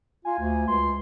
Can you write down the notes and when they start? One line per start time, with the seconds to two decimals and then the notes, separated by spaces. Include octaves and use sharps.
0.25 F4 G#5
0.39 D2
0.68 C#2 C6